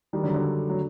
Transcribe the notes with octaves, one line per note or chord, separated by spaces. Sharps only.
D#3 G3
D3 F#3
D3
F#3